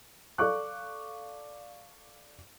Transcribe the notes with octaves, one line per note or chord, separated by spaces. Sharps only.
A4 D5 F5 C#6 D6 F#6